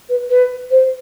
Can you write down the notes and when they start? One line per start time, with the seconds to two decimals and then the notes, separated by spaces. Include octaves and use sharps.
0.09 B4
0.30 B4
0.71 C5